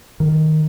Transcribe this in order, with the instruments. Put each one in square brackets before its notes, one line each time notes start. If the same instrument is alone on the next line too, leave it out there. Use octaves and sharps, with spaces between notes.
[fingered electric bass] D#3